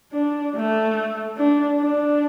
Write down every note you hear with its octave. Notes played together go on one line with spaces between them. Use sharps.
D4
A3
D4
D4